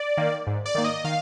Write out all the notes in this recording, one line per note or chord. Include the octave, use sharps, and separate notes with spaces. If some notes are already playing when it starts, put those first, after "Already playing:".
Already playing: D5
D#3 A#3
G#2
D5
D#3 A#3
D#5
D#3 F5